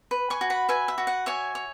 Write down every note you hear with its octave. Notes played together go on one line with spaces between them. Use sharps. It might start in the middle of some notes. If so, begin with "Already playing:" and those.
B4
G#5 C#6
F#4
F#5 B5
B4 E5 G#5
E5
F#4
F#5
C#5 E5 G#5
C#5